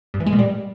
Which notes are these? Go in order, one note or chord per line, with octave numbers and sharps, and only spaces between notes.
G2
E3
G#3
A#2
G3